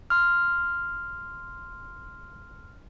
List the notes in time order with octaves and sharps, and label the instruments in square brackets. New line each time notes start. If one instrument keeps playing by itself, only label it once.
[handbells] C6 F6